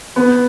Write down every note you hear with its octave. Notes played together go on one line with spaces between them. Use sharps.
B3